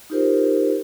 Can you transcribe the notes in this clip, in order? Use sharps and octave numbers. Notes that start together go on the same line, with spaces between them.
D#4 F4 G4 A#4 C5